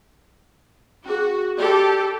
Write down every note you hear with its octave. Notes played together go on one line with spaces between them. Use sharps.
C#4 F#4 G#4
G4 A4 D5 D#5 B5